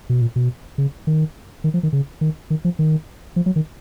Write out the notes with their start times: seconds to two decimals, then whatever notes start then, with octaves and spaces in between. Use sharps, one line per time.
0.09 B2
0.21 A#2
0.36 B2
0.78 C#3
1.07 D#3
1.64 D#3
1.74 F3
1.83 D#3
1.93 C#3
2.21 D#3
2.50 D#3
2.65 F3
2.79 D#3
3.36 F3
3.46 F#3
3.56 D#3